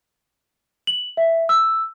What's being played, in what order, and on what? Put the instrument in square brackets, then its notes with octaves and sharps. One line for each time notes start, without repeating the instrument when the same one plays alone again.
[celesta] F#7
E5
E6